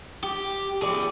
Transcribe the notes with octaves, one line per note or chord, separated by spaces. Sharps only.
G4
G#4 D5